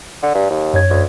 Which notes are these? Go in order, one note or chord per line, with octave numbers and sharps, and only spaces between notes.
D3
G2
D#2
F#2 C#5 G#6
D2